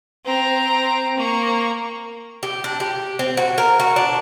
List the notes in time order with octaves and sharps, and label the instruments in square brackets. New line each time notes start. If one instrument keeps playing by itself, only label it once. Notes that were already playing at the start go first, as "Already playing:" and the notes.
[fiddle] C4 A#5
A#3 C#6
[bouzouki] G4
D4
G4
C4
F#4
A#4
F#4
D4